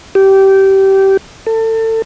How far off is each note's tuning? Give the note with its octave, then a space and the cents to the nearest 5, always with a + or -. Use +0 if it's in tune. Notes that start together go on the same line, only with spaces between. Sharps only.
G4 -20
A4 +30